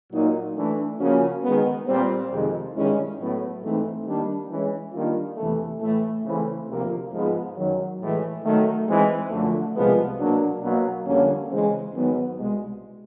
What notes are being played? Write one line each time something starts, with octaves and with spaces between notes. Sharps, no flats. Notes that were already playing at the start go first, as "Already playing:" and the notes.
A#2 F#3 A#3 D#4
E3 A3 D4
C#3 F3 A#3 C#4 F#4
D#3 G#3 B3
A#2 G3 C4
F2 C3 D#3 G#3
G2 D#3 G#3 C#4 E4
A2 F#3 B3
G#2 E3 A3 C4 D#4
D#3 G3 A#3 D4
E3 G#3 C#4
D#3 G3 A#3 D4 F4
E2 C3 E3 A3
A2 E3 A3
C#3 E3 A3 C4 E4
D2 C3 F3 A#3
G#2 F3 G#3 B3
F#2 D#3 F#3
A2 E3 G#3
D#3 F#3 A3
E3 G#3 C4 D#4
F#2 D3 F3 A3
C2 C3 F3 G#3 B3
B2 F#3 A#3 D4
B2 F#3 A#3
F2 D3 G3 A#3 C#4
C#3 E3 G#3 C4
G#2 D#3 F#3 B3
C2 B2 G#3